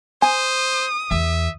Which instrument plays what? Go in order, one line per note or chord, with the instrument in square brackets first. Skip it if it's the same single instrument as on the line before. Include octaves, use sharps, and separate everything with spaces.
[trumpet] C5 [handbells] G#5 [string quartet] D#6
[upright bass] E2 [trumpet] E5